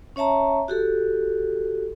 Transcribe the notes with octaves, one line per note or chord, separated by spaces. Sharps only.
C#4 C#5 E5 A5 A#5
F#4 G4 A4